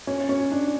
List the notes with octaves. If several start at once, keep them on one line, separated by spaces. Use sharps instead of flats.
C#4
C#4
D4